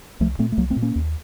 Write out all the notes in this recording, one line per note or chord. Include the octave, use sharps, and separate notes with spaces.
C2 F3 A3
A#2 A3 C4
A3
C2 F#3 A#3
A3 C4
A#2
A#3 C#4
D#2